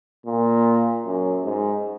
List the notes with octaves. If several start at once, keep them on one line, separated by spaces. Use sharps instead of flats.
A#2
F#2
G#2